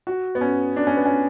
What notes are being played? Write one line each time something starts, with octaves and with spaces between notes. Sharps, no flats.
F#4
B3
C#4
D4
C#4
B3
C#4